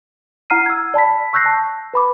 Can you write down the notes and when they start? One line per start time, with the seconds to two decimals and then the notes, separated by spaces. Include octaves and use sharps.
0.50 E4 F#5 A#5 F6 C7 D#7
0.66 E6 G#6
0.94 D5 A5 B5 B6
1.33 C#6 E6 F#6 G6 A#6 C7
1.46 A5
1.94 B4 B5 D6